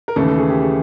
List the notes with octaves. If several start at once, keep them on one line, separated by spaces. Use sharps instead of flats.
A#4
D#2 C#3 E3 A3 C#4 A4
A4
G#4
G4
G#4